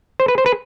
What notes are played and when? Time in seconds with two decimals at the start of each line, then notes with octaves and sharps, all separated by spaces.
0.20 C5
0.28 B4
0.38 C5
0.46 B4